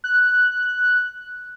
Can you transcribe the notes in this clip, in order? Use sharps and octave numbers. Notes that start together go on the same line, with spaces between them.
F#6